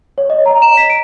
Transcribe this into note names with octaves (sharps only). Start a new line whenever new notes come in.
C#5
D#5
A#5
E7
B6
D7